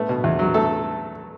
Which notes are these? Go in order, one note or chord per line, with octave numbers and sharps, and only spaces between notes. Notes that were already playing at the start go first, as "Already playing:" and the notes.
Already playing: A3 B3
B2
E2
F#3
A3 A4